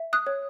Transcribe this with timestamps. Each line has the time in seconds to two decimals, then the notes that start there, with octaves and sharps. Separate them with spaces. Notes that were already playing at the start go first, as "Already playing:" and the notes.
Already playing: E5
0.13 D#6 F#6
0.27 C#5